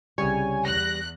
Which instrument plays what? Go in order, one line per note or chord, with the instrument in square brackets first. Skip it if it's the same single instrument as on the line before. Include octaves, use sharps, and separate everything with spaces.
[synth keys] C2 C#3 C#5 [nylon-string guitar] G3 [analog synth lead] G#5
[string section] E2 F#6 [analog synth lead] A#6